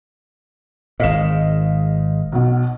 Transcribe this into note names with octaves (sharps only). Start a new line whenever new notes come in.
G#1 G#2 D#5 F5 E7
B1 B2